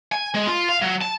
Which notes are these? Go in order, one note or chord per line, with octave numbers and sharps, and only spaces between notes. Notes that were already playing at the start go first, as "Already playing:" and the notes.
G#5
G#3
F4
F5
F#3
A5